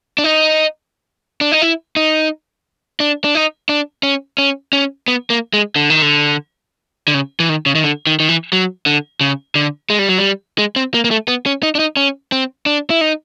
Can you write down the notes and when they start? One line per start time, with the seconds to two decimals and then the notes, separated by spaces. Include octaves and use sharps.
0.18 D4
0.24 D#4
1.41 D4
1.52 D#4
1.62 E4
1.96 D#4
3.00 D4
3.24 D4
3.35 D#4
3.69 D4
4.03 C#4
4.38 C#4
4.73 C#4
5.08 B3
5.30 A#3
5.53 G#3
5.76 D3
5.90 D#3
6.02 D3
7.08 D3
7.14 C#3
7.40 E3
7.49 D#3
7.66 C#3
7.75 D#3
7.83 D3
8.07 D#3
8.20 D#3
8.29 E3
8.53 F#3
8.86 D3
9.21 C#3
9.55 D3
9.90 G#3
9.99 G3
10.09 F#3
10.18 G3
10.59 G#3
10.76 C4
10.94 A#3
11.05 A#3
11.11 A3
11.28 B3
11.46 C#4
11.63 D#4
11.75 D4
11.79 D#4
11.97 C#4
12.32 C4
12.66 D4
12.90 E4
13.01 D#4